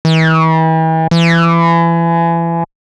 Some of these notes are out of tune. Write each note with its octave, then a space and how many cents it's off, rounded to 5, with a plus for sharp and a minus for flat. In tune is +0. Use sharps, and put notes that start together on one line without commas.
E3 -40
E3 +30